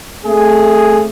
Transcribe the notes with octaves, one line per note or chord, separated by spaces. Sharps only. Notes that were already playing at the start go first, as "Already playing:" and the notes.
A3 C4 G#4